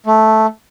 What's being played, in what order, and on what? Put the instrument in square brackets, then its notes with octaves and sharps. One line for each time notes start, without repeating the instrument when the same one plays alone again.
[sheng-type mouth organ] A3